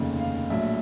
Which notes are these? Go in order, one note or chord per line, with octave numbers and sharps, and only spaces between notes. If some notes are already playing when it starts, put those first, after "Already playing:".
Already playing: F1 D#2 C#3
F5
A#1 A2 F#3 E5